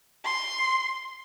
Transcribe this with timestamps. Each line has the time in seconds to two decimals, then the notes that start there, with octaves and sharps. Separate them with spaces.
0.25 C6